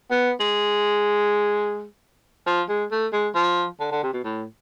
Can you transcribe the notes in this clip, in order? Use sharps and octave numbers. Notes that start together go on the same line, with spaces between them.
B3
G#3
F3
G#3
A3
G#3
F3
D3
D3
C3
B2
A2